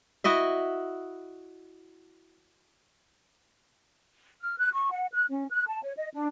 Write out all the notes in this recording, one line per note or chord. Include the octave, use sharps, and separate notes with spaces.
E4 F#4 D#5 E5
F6
F#6
C#6
F#5
F#6
C#4
F#6
A5
C#5
D#5
D4